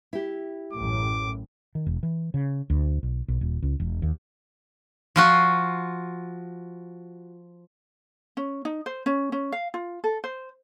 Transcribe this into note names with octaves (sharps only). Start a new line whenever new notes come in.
E4 G4
A1 F#2 A2 D6
D#3
E1
E3
C#3
D2
B1
B1
D#1
C#2
E1
D#2
F3 F4 F#4
C#4
D#4
C5
C#4
C#4
F5
F4
A4
C5